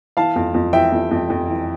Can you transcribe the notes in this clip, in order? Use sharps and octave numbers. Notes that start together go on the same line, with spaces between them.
E3 F5 A5
F2
F2
E3 E5 G5
F2
F2
F2
E3